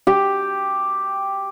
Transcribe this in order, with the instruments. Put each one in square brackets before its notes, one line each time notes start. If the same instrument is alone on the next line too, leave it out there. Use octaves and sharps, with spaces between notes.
[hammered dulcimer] G4